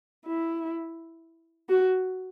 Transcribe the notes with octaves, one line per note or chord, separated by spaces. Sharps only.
E4
F#4